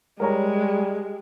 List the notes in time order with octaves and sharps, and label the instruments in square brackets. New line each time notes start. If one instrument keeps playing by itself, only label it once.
[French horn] G3 [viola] G#3 [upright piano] A#4 C#5 A#5